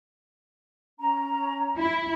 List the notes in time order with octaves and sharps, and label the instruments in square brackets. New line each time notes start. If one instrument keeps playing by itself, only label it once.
[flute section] C#4 A#5
[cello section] E4